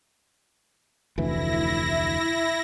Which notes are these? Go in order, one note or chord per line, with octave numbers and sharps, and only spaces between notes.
F1 D2 E3 E4 A#6